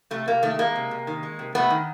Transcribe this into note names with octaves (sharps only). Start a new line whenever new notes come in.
C3 A3
C3 A#3
D#3 A3
G#3 A#3
C3
C3
D#3
G#3
C3
C3 A3 B3
D#3